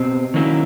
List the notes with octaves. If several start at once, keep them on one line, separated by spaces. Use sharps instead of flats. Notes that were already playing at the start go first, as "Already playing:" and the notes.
Already playing: B2 C4
D#3 F#3 A#3 C#4 E4